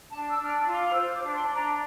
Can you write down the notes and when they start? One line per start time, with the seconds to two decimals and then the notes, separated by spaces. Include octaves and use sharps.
0.11 D4 A5
0.31 E6
0.38 D4
0.44 F6
0.52 E6
0.66 F4
0.72 D6
0.93 C5 E6
1.14 D6
1.21 D4
1.35 C6
1.49 D4
1.55 A#5